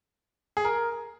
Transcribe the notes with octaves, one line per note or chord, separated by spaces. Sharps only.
G#4
A#4